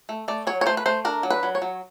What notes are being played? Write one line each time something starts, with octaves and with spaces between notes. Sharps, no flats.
A3
A3 D5
F#3 C#5
C#5
A3 C5
B4
A3 C5
D4 A#4
F#3
B4
F#3
C#5
F#3